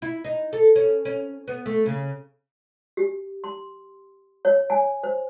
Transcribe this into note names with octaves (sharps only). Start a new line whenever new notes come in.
E4
D#4
A4
C#4
C#4
B3
A3
C#3
G4
C6
C#5
G#5
C5